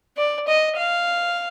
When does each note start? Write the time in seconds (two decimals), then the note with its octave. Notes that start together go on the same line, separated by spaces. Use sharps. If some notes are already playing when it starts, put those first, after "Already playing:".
0.17 D5
0.48 D#5
0.77 F5